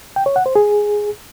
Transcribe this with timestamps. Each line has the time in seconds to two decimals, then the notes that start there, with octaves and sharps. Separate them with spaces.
0.16 G5
0.26 C#5
0.36 F#5
0.46 C5
0.56 G#4